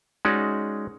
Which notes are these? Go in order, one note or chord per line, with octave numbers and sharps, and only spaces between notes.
G#3 C#4 D#4 F#4 D5